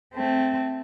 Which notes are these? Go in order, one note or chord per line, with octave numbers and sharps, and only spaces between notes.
A3 C4